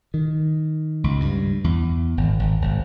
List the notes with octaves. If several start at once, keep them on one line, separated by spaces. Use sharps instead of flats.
D#3
C#2
G2
E2
G#1
G#1
G#1